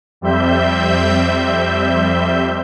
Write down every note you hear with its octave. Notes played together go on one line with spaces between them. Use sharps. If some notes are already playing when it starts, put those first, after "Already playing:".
F2 G3 C4 E5 G6